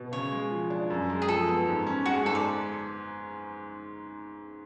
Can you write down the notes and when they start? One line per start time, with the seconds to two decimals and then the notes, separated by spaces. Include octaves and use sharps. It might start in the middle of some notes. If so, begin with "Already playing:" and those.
Already playing: B2
0.12 C#3 C#5
0.32 G#3
0.51 F3
0.70 D4
0.90 F#2
1.10 G#3
1.22 G#4
1.28 F3 A4
1.48 B3
1.67 G#2
1.87 C#4
2.06 G#3 F#4
2.25 G#2 A4
2.35 D5